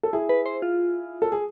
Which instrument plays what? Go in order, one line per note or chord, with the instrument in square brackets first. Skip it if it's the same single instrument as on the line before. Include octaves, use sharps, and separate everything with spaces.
[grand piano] A4
E4 G#4
[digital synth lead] B4
C5
F4
[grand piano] A4
G#4